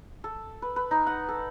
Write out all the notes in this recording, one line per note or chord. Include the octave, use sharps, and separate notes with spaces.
A4
B4
B4
D#4
F#5
A4